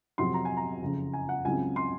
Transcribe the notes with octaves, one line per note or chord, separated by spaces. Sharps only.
F2 C3 F#3 C4 C6
A#5
G#5
A#5
F#1 F2 C#3
G#5
F#5
C#2 C#3 F#3 C4 G#5
C6